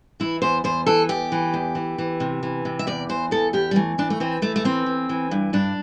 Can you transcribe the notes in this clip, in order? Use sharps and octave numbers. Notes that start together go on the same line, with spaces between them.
E3 E4
E2 C5
E2 C5
E3 A4
E2 G4
E3
E2
E3
E3
C3
E3
C3
E5
E2 D5
E3 C5
E2 A4
E2 G4
G3
E3 A3
E3 D4
A3
E3 C4
E3 A3
A3
E3 C4
E3
E3
G2
G2 D4